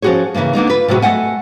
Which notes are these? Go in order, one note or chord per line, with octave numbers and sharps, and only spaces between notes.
F3 C#4 D#4 F#4 G#4 C#5
C#3 E3 F3 A3 A#3
D3 A#3 B3 D#4
F4 B4
A2 C3 F#3 C#4 F#4 G#4
A3 D#5 F#5 G#5